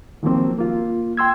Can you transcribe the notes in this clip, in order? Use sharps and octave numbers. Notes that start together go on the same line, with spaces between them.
D#3 F3 F#3 A#3 C4
A#3 F4
G5 C6 E6 G#6